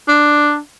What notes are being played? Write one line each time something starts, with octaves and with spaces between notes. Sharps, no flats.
D4